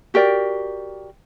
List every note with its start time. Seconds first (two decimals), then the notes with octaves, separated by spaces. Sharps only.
0.14 F#4 G4 A#4 D5